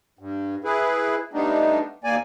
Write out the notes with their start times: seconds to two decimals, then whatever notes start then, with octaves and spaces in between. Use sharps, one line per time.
0.19 G2
0.64 E4 G#4 B4
1.33 G3 A3 B3 D4 D#4
2.04 D#2 A#3 D5 G#5